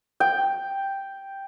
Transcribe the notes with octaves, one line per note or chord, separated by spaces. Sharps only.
G5